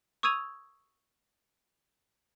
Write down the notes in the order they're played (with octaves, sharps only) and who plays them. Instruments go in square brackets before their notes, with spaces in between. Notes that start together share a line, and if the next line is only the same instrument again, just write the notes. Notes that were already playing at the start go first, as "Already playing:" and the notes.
[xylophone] C#6 D#6 E6 G#6 D#7 F7